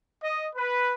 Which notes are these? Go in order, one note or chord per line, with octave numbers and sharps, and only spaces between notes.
D#5
B4